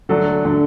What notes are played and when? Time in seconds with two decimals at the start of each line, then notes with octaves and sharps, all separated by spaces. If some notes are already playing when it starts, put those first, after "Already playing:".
0.09 D3 F#3 A3 D4 A4
0.45 D3 F#3 A3 D4